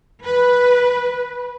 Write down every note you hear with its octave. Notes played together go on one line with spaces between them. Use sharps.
B4